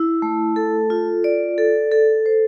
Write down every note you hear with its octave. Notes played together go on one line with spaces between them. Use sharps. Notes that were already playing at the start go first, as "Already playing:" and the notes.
Already playing: E4
A3
A4
F4
D5
A4
A4
C5